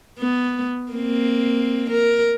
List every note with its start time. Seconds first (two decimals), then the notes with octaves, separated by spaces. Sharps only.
0.19 B3
0.92 A#3 C4
1.90 A#4